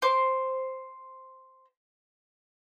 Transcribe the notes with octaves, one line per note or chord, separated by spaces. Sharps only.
C5 D6